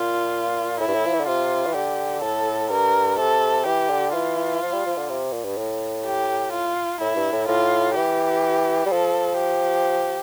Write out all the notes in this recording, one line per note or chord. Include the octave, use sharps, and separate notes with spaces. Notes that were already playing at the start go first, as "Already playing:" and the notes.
Already playing: A#2 F4
A2 E4
G2
A2
F3
E3
D3
C3 F4
E3
D3 G4
A2 A4
G2 A#4
C3 A4
E3 G4
D3
E3 F4
F3
G3
F3
D3
C3
A#2
G2
A2
G4
F4
A2 E4
G2
A2
A2 F4
E3 G4
G3
F3 A4
G4